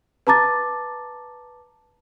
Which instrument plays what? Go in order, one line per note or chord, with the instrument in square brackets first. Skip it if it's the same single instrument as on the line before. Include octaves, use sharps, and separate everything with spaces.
[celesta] B4 A5 A#5 D6 A6